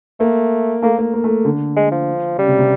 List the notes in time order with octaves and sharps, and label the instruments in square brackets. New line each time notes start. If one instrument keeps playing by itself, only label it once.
[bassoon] A3 [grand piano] A#3
[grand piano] A3 [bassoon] A#3
[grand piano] A#3
A#3
A3
D3
[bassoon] G#3
F3
[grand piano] C#3 [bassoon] G3
[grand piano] C3
C3